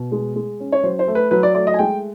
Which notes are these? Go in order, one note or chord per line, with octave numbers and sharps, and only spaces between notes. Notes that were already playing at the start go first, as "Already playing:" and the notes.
Already playing: B2
G#3
G#3
C#4
C#5
F#3 C5
C5
A3
B4
F#3 B4
D5
A3 D5
D#5
G#5
G#3 G5